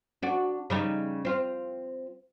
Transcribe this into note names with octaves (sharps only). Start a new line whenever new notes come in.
D4 F#4
C#3 G3 D#4
C4 F4